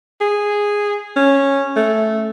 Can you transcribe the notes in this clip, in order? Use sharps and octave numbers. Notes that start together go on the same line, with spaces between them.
G#4
C#4
A3